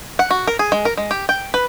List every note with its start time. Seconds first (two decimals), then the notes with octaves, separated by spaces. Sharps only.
0.19 F#5
0.31 F#4
0.47 A#4
0.59 G#4
0.72 G#3
0.85 A#4
0.97 G#3
1.11 G4
1.29 G5
1.54 B4